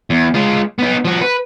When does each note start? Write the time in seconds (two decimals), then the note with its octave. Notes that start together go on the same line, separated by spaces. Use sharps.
0.10 E2
0.34 G#3 F4
0.79 B3 D#4
1.05 F3 F#4
1.22 B4